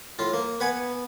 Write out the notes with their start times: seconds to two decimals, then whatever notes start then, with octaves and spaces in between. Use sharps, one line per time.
0.19 A2 F4
0.33 A#3
0.60 B3 B4 F#5 G#5